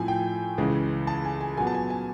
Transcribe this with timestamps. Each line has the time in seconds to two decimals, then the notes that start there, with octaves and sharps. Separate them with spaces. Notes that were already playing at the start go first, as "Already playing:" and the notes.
Already playing: A2 F3 A3 C4 G#5
0.08 G5
0.58 C#2 C#3 E3 G#3
1.07 A5
1.25 G#5
1.41 G#5
1.57 A#2 F#3 B3 G#5
1.67 A5
1.74 G#5
1.90 G#5